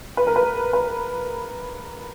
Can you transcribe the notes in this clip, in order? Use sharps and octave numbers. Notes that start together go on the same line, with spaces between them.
B4
A#4
B4
B4